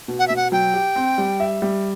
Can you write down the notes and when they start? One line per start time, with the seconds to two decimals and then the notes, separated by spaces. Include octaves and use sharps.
0.08 B2
0.19 F#5
0.28 B2 E5
0.36 F#5
0.52 F#3 G5
0.74 G4
0.96 C4
1.18 G3
1.40 E5
1.62 G3